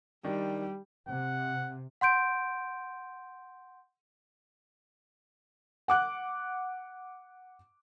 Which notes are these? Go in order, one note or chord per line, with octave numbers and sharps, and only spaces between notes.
D#3 G3 D4
C3 F#5
F#5 C6 G6 D7
F#5 D6 F#6